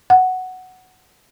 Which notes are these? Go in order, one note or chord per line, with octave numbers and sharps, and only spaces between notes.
F#5